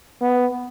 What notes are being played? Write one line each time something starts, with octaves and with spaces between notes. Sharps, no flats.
B3